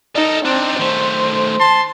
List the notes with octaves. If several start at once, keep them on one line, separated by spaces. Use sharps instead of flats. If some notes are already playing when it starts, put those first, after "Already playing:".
D#4 A4 A#4
C4 D4 D#4
D#3 A3 C5
A5 C6